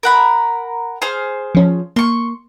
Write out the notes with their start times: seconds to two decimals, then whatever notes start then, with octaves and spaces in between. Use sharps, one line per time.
0.03 A#4 F#5 B5
1.02 G#4 C5 F6
1.55 F3 C#4
1.96 A#3 C6 C#6